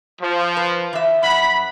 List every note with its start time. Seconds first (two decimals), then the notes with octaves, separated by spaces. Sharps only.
0.22 F3
0.57 B4
0.93 E3 E5
1.23 F#2 F#5 B5